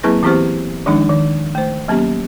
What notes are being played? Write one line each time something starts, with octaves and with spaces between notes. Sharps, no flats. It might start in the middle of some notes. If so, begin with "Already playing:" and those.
F#3 A#3 C4 E4 G#4 B4
E3 B3 C4 E4 G4 C5
D#3 F3 G#3 D4 D#4
D#3
A3 C5
F#3 A#3 B3 C#4 G4